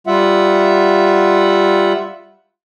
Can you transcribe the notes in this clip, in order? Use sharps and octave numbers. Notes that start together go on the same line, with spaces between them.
G3 F4 E5 F#5